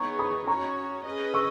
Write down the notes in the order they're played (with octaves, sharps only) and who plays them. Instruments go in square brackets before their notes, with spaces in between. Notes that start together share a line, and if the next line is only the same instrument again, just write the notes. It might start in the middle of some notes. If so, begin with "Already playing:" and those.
Already playing: [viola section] E3 B3 D#4 G#4 C#5 [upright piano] A#5 C#6
[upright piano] B5 D#6
[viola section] C#4 F#4 C#5 [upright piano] A#5 C#6
[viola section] C#4 G#4 B4 D#5
[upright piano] C#6 E6